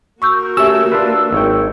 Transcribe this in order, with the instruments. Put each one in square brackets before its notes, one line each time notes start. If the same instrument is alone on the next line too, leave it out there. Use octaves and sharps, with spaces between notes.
[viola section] A#3 F#4 A#4 [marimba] C#6 E6 G6
[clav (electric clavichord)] A3 C#4 [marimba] G4 E5 [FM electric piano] E6
[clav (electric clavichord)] D4 F4 B4
G#1 C#5 G5